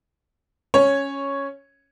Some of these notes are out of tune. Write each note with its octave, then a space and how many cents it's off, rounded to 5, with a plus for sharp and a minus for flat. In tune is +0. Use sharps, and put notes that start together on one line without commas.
C#4 +0 C#5 +0